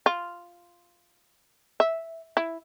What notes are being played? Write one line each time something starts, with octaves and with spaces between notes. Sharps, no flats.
F4
E5
E4